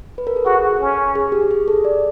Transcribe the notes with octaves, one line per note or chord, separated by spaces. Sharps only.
B4
A#4
A4
F#4 G#4
C#4
G#4
G4
G#4
A4
D5